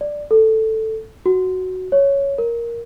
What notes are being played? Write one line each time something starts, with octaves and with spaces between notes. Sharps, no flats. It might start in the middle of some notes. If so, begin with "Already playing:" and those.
D5
A4
F#4
C#5
A#4